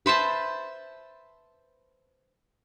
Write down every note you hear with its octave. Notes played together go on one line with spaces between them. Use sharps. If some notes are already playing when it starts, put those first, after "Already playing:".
B4 C5 E5 A5